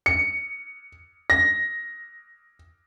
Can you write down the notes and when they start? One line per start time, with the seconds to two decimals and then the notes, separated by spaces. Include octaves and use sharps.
0.06 C#7
1.30 A#6